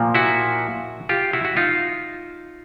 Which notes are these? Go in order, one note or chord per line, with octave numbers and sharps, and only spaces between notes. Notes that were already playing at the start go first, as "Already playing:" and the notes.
Already playing: A#2 F3 A#3
E4 F#4
F4 G4
E4 F#4
F#4
D#4 F4